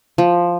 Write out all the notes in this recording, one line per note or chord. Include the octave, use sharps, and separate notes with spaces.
F3